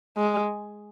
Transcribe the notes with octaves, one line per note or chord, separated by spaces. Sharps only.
G#3